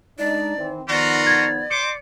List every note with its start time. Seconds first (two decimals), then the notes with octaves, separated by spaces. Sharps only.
0.19 G#3 D4 D#4 D5
0.57 D#3 E3 C4
0.89 D#3 F3 B3 F4 F#4 D5 A#5
1.27 G#6 A6
1.71 C5 C6 D6 C#7